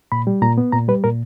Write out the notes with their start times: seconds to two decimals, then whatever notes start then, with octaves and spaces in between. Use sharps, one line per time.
0.12 A#2 B5
0.27 G3
0.42 A#2 A#5
0.58 B3
0.72 A#2 A#5
0.88 G3 B4
1.04 A#2 A#4